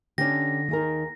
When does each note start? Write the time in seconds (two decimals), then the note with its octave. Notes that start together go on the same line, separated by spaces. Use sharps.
0.18 D3 C#4 D#4 G4 A#6
0.69 D#2 D#3 G#4 A#4